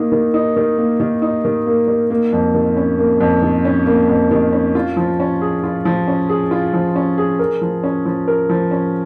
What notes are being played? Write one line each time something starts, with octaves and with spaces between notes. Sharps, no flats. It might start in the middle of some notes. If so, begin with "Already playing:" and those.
Already playing: D#3 A#3 D#4
D#3
D#4
D#3
A#3
D#3
D#4
D#3
A#3
D#3
A#3
F2
D#3
C#4
A#3
F2
D#3
C#4
A#3
F2
D#3
C#4
F4
F3
C#4
G#4
F4
F3
C#4
G#4
F4
F3
C#4
G#4
A#4
F3
C#4
F3
A#4
F3
C#4